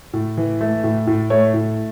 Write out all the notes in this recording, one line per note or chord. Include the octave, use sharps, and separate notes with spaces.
A2
E3
A3
A2
A2
A3 C#5
A2